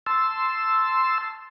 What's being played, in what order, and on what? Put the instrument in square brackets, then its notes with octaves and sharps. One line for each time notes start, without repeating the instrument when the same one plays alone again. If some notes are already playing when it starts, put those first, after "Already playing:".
[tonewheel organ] A5 C6 E6